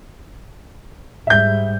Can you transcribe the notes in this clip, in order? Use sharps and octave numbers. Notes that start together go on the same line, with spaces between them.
G#2 G3 E5 G6